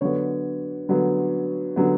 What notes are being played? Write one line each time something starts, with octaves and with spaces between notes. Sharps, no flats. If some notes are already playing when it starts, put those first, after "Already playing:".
D3 F#3 B3 C#5
D3 F#3 B3
D3 F#3 B3